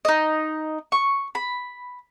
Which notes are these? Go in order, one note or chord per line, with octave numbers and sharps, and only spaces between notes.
D#4 D#5
C#6
B5